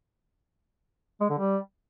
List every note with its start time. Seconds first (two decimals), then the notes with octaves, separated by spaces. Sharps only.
1.21 G#3
1.30 D3
1.39 G3